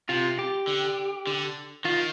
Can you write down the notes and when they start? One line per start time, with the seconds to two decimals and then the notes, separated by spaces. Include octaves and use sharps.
0.09 C3 F4
0.39 G4
0.68 D3
1.27 D3
1.85 D#3 F4